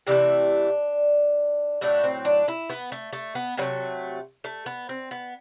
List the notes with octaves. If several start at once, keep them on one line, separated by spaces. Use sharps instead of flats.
C3 E3 A3 D4
A2 F#3 A3 D4
C4
D4
E4
B3
A3
A3
B3
C3 F#3 A3 B3
A3
B3
C4
B3